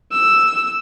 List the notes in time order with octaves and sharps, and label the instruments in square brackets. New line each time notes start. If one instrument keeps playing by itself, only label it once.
[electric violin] E6